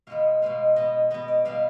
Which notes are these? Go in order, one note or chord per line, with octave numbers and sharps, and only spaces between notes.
B2 G#3 B3 F5
B2 G#3 B3 F5
B2 B3 D#5
B2 B3 D#5
D5
B2 G3 B3 F5